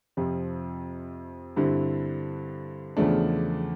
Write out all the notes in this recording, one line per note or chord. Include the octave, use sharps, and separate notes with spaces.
F2 C3 F3
G2 D3 G3 C4 E4
E2 C#3 F3 A3 D4